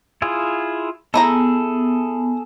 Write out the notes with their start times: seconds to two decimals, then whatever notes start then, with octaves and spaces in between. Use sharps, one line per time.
0.22 E4 F4 G#4
1.14 A3 B3 E4 G#4 A4 A#5